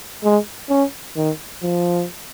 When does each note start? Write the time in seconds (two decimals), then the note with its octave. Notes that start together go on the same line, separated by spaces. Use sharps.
0.24 G#3
0.70 C#4
1.16 D#3
1.63 F3